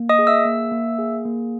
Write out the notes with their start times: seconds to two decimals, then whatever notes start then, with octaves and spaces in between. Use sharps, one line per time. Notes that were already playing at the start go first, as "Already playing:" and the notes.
Already playing: A#3
0.09 D#5 D#6
0.19 G#4
0.27 E5 E6
0.45 A#3
0.72 A#3
0.99 G#4
1.25 A#3